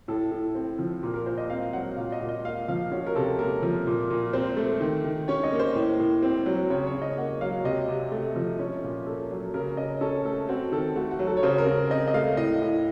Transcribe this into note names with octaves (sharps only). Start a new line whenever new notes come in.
A2 A4
A2
C4
F3
A#2 A#4
A#4
A#2 C5
D#5
C4 F5
F#3 F#5
A#2 F5
D#5
A#2
D#5
A#3 F5
F3 F5
C#4 F#4
A#4
C3 A4
A#3 A#4
F3
A#2
A#2
C4 C5
A3
D#3
D#3
C#4 C#5
D#5
A#3
C5
A2
A2
C4
F#3
C#3 C#5
C#5
C#3
D#5
A#3 F#5
F#3 F5
C3 D#5
C3
A3
F3
C#4
A#2
A#3 A4
F#3
C#3 A#4
C#3 D#5
C#4 A4
A3 A4
C4 F#4
D#3 A4
A3 F#4
F#4
F#3
A4
C#5
C#3 C5
A#4
C#3
C4 D#5
D#5
A3 F5
A2 D#5
A2